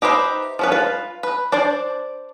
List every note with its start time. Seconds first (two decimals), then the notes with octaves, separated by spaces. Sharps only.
0.02 D#4 G4 B4 C5 E5
0.59 F3 C#4 B4
0.72 F4 B4
1.23 B4
1.52 D4 C5 D5